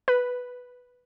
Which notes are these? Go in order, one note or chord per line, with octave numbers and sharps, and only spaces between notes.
B4